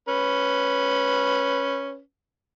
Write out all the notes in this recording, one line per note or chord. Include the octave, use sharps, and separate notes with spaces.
C#4 B4